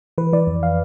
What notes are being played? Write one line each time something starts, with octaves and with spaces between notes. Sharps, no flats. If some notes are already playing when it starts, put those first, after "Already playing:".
E3 B4
E3 D5
F2
F5